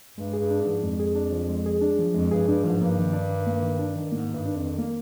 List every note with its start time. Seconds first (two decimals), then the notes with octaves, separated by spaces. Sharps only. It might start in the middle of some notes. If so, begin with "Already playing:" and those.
0.17 G2 G#3
0.33 G#4
0.38 G2
0.51 D4
0.61 G#2
0.67 F3
0.83 F2 G#3
0.99 G#4
1.15 D4
1.32 F3
1.49 G#3
1.66 G#4
1.81 D4
1.99 F3
2.14 F2 G#3
2.31 G2 G#4
2.47 G2 D4
2.64 G#2 F3
2.81 G2 A#3
2.98 D#3
3.13 D4
3.30 D#3
3.47 A#3
3.62 D#3
3.79 D4
3.96 D#3
4.12 G#2 A#3
4.29 D#3
4.34 G2
4.45 D4
4.56 F2
4.62 D#3
4.78 A#3